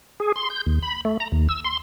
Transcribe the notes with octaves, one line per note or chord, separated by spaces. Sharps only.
G#4
C6
G6
D#2
B5
A3
A#5
D#2
E6
C6